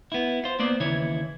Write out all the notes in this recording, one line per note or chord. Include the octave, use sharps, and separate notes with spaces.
B3 E4
F4 C5
A#3 B3 C5 D5
D#2 C#3 E3 E4 C#5